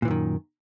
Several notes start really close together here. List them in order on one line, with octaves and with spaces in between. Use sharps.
A#2 E3 F#2 D#3